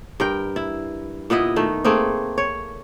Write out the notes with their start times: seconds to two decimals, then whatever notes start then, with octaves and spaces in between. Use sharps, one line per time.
0.20 G2 A#4 G5
0.56 E4
1.30 A#2 B3 E4 D#5
1.56 D#3 A3
1.84 A3 A#3 C4 G#4
2.38 C#5